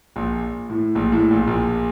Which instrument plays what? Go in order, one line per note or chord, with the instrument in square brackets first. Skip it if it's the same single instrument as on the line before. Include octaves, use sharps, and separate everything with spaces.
[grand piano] A#1 A#2
A2
A#1 A#2
A2
A#1 A#2
A#1 A#2